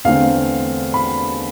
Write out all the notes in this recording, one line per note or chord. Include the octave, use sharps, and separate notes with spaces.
E2 D3 A3 C4 F5
B5